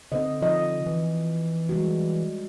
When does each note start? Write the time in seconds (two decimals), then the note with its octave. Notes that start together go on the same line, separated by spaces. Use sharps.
0.12 D3 C4 C5 D#5
0.42 F3 F4 D#5
0.86 E3
1.69 G3 G#3 F#4